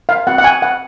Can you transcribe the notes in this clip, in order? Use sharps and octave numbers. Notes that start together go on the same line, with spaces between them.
F5
C4 F#4 F#5
F#5
G#5
F#5